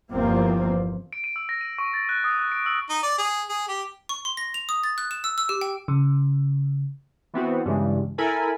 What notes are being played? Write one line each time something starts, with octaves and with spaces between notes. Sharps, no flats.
G1 E2 F3 A#3 C4
D7
D#7
E6
A#6
D#7
C#6
A6
F#6
D#6
F#6
D7
E6
D#4
D5
G#4
G#4
G4
C#6
C6
A#6
F7
D#6
A6
F#6
E7
E6
E6
G4
G5
C#3
E3 B3 C4 F#4
G2 C#3 E3 G#3
E4 A4 A#4 G#5 B5